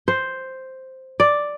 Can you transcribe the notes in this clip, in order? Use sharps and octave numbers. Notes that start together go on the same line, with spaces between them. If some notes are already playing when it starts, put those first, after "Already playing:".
C5
D5